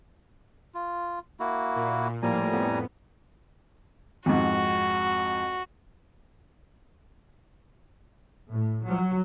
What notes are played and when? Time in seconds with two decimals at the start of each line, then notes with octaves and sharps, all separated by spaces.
0.75 F4
1.40 A#3 E4 F#4
1.76 A#2
2.22 A2 F3 G3 A#3 G#5 A#5
2.52 F2 A2 B3
4.26 F2 G#2 F#4
8.51 A2
8.86 F#3